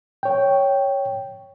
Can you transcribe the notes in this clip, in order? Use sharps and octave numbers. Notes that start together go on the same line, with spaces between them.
C#5 G5